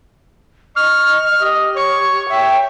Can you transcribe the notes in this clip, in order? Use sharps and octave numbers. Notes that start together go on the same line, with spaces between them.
D#5 C#6 F6
G4 D#5
C#5 C#6
E5 G5